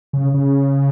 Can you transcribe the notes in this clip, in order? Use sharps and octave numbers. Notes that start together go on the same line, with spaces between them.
C#3
C#3